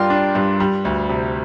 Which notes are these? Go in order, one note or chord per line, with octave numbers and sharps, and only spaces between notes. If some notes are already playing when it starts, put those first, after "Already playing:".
Already playing: G2 G3 D4 F4 G4 A#4 D5 C6
D4
G2
G3
D2
C3